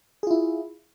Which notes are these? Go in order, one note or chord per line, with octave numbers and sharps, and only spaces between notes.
E4 F4 G#4